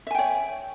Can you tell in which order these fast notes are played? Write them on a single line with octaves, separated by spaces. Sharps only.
E5 G#5 G5 C#5